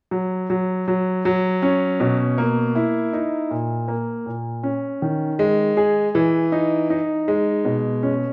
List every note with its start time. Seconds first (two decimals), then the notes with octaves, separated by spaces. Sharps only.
0.11 F#3
0.50 F#3
0.88 F#3
1.25 F#3
1.62 C#4
2.00 B2
2.38 A#3
2.75 E4
3.13 D#4
3.51 A#2
3.88 A#3
4.26 A#2
4.63 C#4
5.02 D#3
5.39 G#3
5.77 G#4
6.15 E3
6.52 D#4
6.90 D#4
7.28 G#3
7.65 B2
8.03 C#4